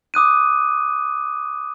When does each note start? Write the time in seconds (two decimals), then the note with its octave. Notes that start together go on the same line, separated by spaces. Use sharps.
0.14 D6 D#6 F#6 D#7